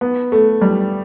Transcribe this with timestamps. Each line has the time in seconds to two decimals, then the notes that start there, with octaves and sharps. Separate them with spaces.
0.01 B3
0.32 A3
0.61 G3